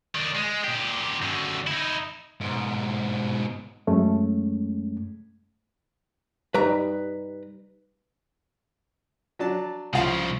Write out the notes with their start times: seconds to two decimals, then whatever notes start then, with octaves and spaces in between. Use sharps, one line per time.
0.15 D#3 D4
0.35 G#3
0.64 A#2 G4
1.22 F#2 D3
1.67 D#4 E4
2.40 G#2 B2
3.87 F#2 G#3 A3 C#4
6.54 G3 D#4 B4 A#5
9.39 F#3 D4 A5
9.93 C2 C#3 F3 F4 F5